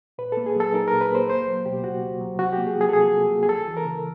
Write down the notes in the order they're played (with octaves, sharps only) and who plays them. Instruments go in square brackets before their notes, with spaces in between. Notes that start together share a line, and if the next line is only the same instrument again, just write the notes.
[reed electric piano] A#2 B4
A#3 A4
G#4
F#3 A4
D#4 A#4
A#2 A#4
B4
A#3 C5
C#2 C5
F#3
B2 G4
C#2 F#4
C#2
F#3
C3 F#4
G4
A#3
G#4
F3
G#4
A4
C3 G#4
C3
A#3
G#4
C#2 A4
E3
A#4
C#3